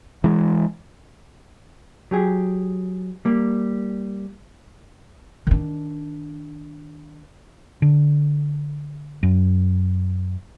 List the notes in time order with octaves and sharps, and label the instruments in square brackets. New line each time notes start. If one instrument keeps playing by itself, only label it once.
[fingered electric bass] E3 G#3
[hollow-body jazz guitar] F#3 G4 G#4
G3 A#3
[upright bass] D#3 D4
[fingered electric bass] D3
F#2